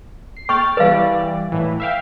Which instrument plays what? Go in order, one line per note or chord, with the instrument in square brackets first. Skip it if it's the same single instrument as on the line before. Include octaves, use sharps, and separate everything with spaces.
[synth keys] C7
[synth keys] G5 F6 A6 [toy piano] C#6
[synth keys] E3 G3 D5 [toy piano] B4 F5
[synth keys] A2 E3
E5 F5 G5